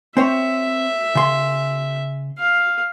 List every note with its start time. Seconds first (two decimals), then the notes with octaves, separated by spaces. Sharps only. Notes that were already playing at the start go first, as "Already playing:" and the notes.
0.17 C4 C5 C#5 E5
1.15 C#3 C6
2.39 F5